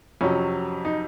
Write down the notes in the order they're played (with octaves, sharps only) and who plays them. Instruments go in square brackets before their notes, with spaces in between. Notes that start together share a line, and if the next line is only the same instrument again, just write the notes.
[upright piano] F2 C3 F#3 C#4
D#4